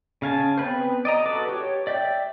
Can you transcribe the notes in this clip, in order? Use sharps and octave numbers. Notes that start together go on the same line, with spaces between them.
C#3 F5 G#5 A5
B3 C4 B4 C5
D5 D#5 A#5
F#4 A4 B4 D6
G4 C#5
D5 E5 G5